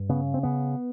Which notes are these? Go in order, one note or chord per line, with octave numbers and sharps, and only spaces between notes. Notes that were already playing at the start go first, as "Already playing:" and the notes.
Already playing: G2
C#3 B3
C4
C#3 B3